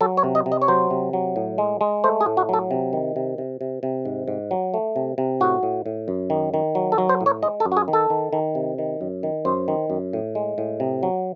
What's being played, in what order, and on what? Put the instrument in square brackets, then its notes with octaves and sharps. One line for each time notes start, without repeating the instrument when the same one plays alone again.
[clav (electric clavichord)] F#3 A4
C#5
C3
D#5
C3
D#5
C#5
F#3 C5
C3
F#3
A2
G#3
G#3
A3 C5
G#4
A2
F#4
F#3 A4
C3
D#3
C3
C3
C3
C3
G#2
G#2
F#3
A3
C3
C3
A2 F#4
A2
A2
F#2
D#3
D#3
F#3
A4
F#3
C5
A2
C#5
G#3 D#5
A4
F#2
F#4
G#4
D#3
A4
D#3
D#3
C3
D#3
F#2
D#3
F#2 C5
D#3
F#2
A2
G#3
A2
C3
F#3